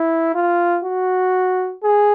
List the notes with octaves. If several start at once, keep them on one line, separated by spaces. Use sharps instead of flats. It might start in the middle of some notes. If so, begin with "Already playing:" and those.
Already playing: E4
F4
F#4
G#4